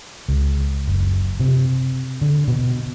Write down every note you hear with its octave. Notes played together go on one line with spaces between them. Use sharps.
C#2
F#1
C3
D3
B2